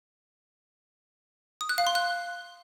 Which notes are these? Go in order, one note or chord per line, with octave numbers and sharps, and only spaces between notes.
D#6
F#6
F5
C6
F#6